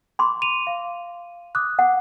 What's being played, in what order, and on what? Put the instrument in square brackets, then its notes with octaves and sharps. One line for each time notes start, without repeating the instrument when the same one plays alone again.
[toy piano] B5 C6 D6
[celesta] D#7 F7
F5
D6 D#6 F#6
[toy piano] F#5